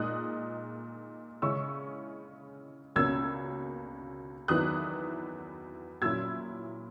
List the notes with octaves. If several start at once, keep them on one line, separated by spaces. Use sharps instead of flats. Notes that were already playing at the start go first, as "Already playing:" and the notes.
Already playing: A#2 G#3 D#4 D#6 F#6
C#3 G#3 C#4 E4 C#6 E6
C#2 B2 A#3 C#4 E6 G#6
E2 D#3 F#3 B3 E4 D#6 F#6
A#2 F#3 C#4 E4 E6 G#6